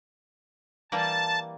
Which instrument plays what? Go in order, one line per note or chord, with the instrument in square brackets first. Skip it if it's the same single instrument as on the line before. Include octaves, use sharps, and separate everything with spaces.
[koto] E3 G3 A#3 [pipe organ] A5